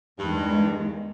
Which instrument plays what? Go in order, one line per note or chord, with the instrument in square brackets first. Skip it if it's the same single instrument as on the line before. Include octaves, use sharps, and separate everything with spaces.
[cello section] E2 D#3 G#3 [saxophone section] G2